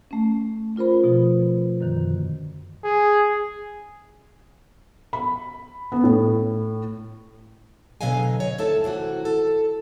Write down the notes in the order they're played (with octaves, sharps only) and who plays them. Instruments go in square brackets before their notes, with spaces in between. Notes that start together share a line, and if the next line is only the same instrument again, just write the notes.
[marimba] A3 C#4
C#4 F4 A#4 C5 B5
B2 F3
F#2 D3 D#3
[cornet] G#4
[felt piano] B5
B3
A2
[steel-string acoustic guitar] B2 D3 F#3 D#5 F5 G#5
C#5
D#2 A3 C#4 E4 A4 A5
C3 E3 A3 F#4
A4